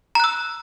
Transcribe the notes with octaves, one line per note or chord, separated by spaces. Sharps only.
A#5 E6 F#6